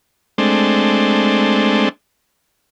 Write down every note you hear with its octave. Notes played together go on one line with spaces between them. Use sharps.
G#3 A3 C4 D4